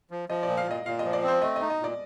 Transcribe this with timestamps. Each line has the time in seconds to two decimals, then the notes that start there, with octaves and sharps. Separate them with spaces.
0.11 F3
0.29 F3 D#5
0.43 A#2 D5
0.57 F5
0.66 A#2 D#5
0.86 A#2 F5
0.99 D#5
1.04 F3
1.13 D5
1.23 C4 C5
1.42 A3 D#5
1.56 D#4 D#5
1.70 D#5
1.80 A#2 D5